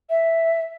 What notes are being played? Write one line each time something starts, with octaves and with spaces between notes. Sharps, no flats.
E5